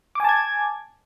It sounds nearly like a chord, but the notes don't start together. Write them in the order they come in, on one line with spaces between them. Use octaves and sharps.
D6 G#5 A5 G#6